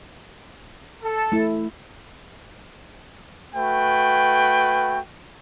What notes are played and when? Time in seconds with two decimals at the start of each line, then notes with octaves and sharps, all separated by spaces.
1.03 A4
1.32 A3 E4
3.55 A3 F#4 B4 G5